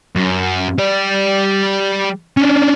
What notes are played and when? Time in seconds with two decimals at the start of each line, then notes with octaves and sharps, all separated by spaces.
0.16 F#2
0.79 G3 D5
2.37 C#4 D4